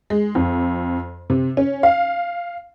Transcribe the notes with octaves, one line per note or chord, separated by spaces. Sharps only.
G#3
F2
C3
C#4
F5